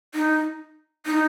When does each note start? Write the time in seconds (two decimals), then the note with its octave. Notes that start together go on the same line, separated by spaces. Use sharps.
0.15 D#4
1.06 D#4